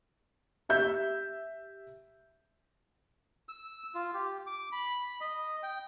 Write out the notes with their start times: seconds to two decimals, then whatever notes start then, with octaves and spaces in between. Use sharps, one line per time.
0.69 G4 E5 G6
3.49 E6
3.95 F4
4.14 G4
4.47 D6
4.72 B5
5.21 D#5
5.63 G5